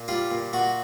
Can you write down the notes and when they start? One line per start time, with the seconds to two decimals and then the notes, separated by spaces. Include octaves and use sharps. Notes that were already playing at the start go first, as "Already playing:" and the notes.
Already playing: A#2
0.08 G3 F4
0.31 A#2
0.53 A#2 F#4